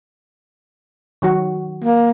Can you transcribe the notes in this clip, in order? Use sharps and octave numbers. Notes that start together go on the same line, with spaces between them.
D#3 F#3 F#4
A#3